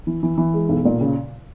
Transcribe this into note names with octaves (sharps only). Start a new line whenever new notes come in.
E3
E3
E3
G#3
B1
A#2
C#3